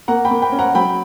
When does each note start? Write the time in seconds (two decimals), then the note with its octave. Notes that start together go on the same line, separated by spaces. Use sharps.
0.08 A#3 F#5 A#5
0.25 G5 B5
0.31 A#3
0.42 G5 B5
0.52 C#4
0.59 F#5 A#5
0.75 F#3 G5 B5